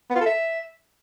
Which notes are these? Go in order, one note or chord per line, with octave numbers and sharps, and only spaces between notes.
B3
F4
A4
E5